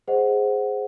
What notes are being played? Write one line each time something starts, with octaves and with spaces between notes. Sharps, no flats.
G#4 C5 D#5 F#5